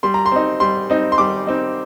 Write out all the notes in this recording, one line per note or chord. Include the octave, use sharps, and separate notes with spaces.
G3 C6
A#5
C6
C4 D#4
G3 C6
C4 D#4
C6
G3 D6
C4 D#4